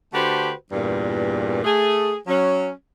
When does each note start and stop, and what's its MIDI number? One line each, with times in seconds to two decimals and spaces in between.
0.13 0.51 50
0.13 0.51 57
0.13 0.51 66
0.13 0.51 67
0.13 0.51 71
0.13 0.51 72
0.72 1.63 40
0.72 1.63 43
0.72 1.63 46
1.64 2.14 57
1.64 2.14 68
2.27 2.70 54
2.27 2.70 61